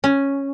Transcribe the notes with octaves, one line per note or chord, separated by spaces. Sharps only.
C#4